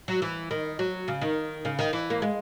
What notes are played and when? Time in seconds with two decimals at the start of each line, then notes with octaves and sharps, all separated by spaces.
0.08 F#3
0.22 E3
0.51 D#3
0.79 F#3
1.08 C#3
1.21 D#3
1.65 C#3
1.79 D#3
1.93 E3
2.10 A#3
2.22 G#3